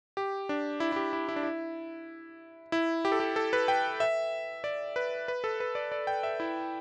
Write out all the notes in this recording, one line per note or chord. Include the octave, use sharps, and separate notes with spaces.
G4
D4
E4
E4
G4
E4
E4
D4
E4
E4
G4
A4
G4
A4
B4
G5
E5
D5
B4
B4
A4
B4
D5
D5
G5
E5
E4